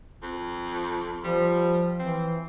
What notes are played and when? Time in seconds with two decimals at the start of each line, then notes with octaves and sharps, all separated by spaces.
0.23 F2
1.24 F3 G3
1.99 E3 C4